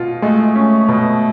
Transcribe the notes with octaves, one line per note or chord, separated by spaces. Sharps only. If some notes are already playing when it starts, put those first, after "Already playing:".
Already playing: B2 F4
G#3 A3
C#4
B2